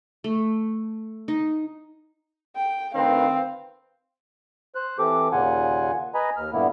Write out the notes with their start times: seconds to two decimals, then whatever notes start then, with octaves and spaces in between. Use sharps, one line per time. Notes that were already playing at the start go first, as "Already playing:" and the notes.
0.24 A3
1.28 D#4
2.56 G5
2.95 D2 D#3 C4 B4 F5
4.75 C5 F#6
4.99 E3 C4 G4 A4 D6
5.32 D#2 A#2 C#3 F4 F#5 G#5
6.15 B4 D#5 G#5 A#5 B5
6.37 D#2 F6
6.53 G2 A#2 D3 A#3 B3 E4